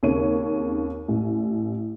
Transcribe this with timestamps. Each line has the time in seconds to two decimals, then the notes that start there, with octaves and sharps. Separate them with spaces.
0.03 D#2 C#3 C4 C#5 D#7
1.08 A1